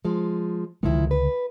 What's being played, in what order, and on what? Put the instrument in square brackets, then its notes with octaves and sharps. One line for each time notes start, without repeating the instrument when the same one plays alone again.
[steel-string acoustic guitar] F3 G#3
[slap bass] C#2 D3 G#3 [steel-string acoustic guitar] D#3 F3 E4
[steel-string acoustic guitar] B4